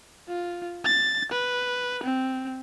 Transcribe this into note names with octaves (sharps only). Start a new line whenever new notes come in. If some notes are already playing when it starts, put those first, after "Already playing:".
F4
A6
B4
C4